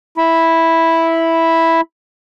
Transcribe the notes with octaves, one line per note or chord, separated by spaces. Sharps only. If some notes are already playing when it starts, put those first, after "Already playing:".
E4 B5